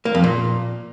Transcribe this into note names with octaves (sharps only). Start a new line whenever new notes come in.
A#3
F2
A#2